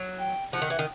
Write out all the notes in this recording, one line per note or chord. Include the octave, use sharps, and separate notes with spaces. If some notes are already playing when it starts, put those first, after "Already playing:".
Already playing: F#3
G5
F3 F#5
D#3
E3
D#3